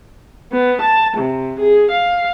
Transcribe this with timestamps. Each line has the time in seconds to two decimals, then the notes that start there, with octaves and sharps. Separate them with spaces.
0.51 B3
0.82 A5
1.16 C3
1.60 G#4
1.91 F5